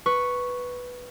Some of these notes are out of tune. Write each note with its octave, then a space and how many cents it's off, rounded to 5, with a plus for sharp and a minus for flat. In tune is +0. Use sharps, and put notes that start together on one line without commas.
B4 +0 C#6 +0